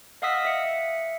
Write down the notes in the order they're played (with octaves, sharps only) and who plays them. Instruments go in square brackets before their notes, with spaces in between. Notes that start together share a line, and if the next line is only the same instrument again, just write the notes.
[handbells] D#5 F5 F#5 D#6 E6 B6
E5 C#7